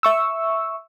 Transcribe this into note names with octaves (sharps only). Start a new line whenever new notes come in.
E5 C#6 E6